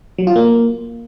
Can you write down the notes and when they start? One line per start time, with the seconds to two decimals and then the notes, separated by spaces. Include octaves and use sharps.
0.18 F#3
0.27 F4
0.36 A#3